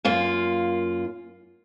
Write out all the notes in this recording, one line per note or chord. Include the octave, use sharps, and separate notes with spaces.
F#2 A#3 F4